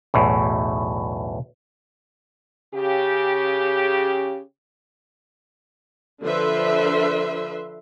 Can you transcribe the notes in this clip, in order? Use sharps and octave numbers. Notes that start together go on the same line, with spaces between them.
B1 E2 A2
C#3 G4
D3 F3 B4 E5 C6